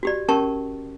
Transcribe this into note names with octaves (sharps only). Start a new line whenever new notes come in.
F#4 G4 D5
C#4 G4 A#4 A5 C#6